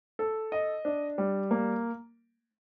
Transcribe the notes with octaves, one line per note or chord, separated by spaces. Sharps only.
A4
D#5
D4
G3
A#3